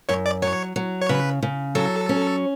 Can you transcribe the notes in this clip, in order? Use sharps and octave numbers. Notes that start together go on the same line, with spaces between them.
F#2 C#5
D5
F#3 C#5
F#3
C#5
C#3 B4
C#3
F#3 A4
C#4